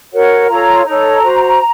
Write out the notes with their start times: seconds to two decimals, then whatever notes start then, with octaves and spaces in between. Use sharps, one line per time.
0.12 F#4 A#4 C#5 F#5
0.48 F4 A4 C#5 A#5
0.84 D#4 A4 C#5 A#5
1.22 F#4 C5